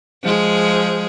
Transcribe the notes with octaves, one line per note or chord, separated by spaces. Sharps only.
F3 G#3 G#4